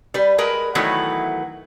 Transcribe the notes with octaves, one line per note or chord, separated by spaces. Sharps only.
G3 B4
G#3 A#4 B4
D#3 E3 F#3 A3 B3 E4